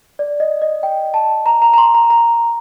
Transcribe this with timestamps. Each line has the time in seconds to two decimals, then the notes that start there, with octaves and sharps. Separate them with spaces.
0.19 D5
0.40 D#5
0.62 D#5
0.83 G5
1.14 A5
1.46 A#5
1.62 A#5
1.74 A#5
1.78 C6
1.94 A#5
2.10 A#5